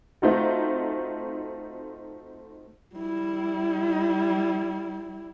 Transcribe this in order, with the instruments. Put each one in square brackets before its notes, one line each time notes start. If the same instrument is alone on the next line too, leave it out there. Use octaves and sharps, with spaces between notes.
[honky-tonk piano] A3 C4 D#4 F4 F#4
[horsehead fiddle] G3 E4